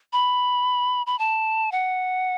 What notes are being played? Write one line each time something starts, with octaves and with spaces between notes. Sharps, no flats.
B5
B5
A5
F#5